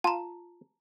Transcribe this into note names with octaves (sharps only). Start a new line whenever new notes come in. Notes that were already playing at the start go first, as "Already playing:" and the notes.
F4 A5 A#5